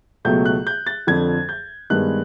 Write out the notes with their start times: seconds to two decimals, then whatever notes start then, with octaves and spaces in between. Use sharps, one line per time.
0.25 C#2 B2 F#3 A3 G6
0.45 F#6
0.67 G6
0.87 A6
1.07 F2 D3 F3 G#6
1.49 G6
1.90 G2 D#3 G#3 B3 F#6